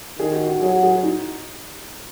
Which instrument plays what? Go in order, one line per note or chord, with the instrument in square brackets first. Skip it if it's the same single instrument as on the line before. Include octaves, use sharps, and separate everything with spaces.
[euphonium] D#3 [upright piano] G#4
[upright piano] F#4
F#4
[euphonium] F#3 [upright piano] G#4
[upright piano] G#4
G#4
F#4
D#4